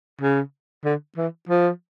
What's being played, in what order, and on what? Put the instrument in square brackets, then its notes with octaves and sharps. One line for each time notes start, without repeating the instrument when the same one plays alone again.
[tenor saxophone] C#3
D3
E3
F3